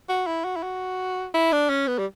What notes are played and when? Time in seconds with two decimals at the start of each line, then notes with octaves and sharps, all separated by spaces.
0.09 F#4
0.27 E4
0.45 F#4
0.56 E4
0.63 F#4
1.34 E4
1.52 D4
1.69 C#4
1.88 B3
1.99 G3